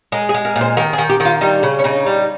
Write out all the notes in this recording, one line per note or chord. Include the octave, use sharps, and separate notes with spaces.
G#3 A#4
G#4
G#3
A#4
A#2
C5
D#3 A#4
G#4
D#3
G4
D#3
F4
G3 D#4
C#3
C#4
C#3 D#4
G3